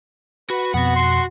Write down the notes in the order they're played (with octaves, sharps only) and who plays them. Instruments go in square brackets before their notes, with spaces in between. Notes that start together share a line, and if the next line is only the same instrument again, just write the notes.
[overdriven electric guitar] F#4 [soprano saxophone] B4
[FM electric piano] F2 B2 [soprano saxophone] B3 [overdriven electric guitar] F#4 F#5
[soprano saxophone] C6